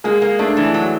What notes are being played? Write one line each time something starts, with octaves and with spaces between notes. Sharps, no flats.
G#3 A#3
A#3
A3 D4
E3
F#3